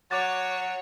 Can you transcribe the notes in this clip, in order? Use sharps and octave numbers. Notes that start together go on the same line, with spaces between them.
F#3 C#5 D6 A6